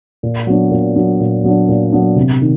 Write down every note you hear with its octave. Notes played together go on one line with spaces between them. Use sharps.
A#2
F#3 B3 D4
A#2
F#3 B3 D4
A#2
F#3 B3 D4
A#2
F#3 B3 D4
C3
D#3